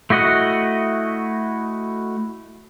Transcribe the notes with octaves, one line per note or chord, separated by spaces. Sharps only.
A3 E4 F#4 D#5 F#5